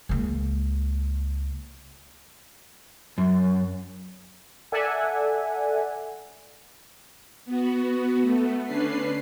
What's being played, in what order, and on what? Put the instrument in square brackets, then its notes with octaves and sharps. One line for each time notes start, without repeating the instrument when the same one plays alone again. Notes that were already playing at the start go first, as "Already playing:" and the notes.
[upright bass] C#2 A#3
[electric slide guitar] F#2
[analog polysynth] A4 D5 E5 F#5 G#5
[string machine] B3 F#4
A3 B3
D3 C#4 D4 B4 C7